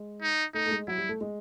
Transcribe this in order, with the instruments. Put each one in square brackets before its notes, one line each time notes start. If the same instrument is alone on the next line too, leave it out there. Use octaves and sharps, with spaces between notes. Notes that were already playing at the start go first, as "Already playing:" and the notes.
Already playing: [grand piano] G#3
[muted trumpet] D#4
[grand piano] A3 [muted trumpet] D#4
[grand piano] A3
G#3
[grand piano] F#3 [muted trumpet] E4
[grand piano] G3
A3
G#3